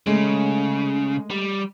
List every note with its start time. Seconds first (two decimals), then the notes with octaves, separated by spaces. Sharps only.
0.07 C#3 G#3 A3
1.31 G3